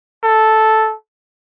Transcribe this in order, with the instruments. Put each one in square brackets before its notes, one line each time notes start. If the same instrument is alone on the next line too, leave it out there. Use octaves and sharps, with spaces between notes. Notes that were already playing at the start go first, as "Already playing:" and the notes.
[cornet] A4